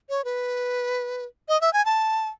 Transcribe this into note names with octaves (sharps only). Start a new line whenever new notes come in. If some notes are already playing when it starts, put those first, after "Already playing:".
C#5
B4
D#5
E5
G#5
A5